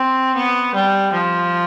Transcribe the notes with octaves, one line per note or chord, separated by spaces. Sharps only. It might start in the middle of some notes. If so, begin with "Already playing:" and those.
Already playing: C4
B3
G3
F3